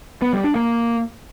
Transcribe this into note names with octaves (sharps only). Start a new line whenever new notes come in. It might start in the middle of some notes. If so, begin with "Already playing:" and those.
B3
G3
D4
A#3